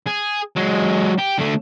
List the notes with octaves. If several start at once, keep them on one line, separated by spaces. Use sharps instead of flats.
G#4
F#3 G#3
G4
D3 A3